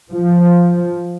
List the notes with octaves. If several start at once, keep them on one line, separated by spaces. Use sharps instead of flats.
F3